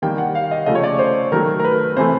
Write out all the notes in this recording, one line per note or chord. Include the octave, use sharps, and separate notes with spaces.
D#3 G3 A#3 G5
F#5
F5
D#5
C#3 F3 A3 D#5
C#5
D5
C5
D#3 F#3 A3 A#4
A#4
B4
C3 E3 A3 C5